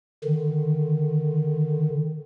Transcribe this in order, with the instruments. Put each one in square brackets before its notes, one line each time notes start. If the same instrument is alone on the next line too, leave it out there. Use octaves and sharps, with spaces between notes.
[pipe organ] D3 D#3